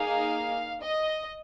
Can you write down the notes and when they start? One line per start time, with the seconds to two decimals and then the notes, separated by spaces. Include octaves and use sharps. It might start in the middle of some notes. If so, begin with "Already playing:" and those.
Already playing: A#3 D#4 G#4 F5
0.83 D#5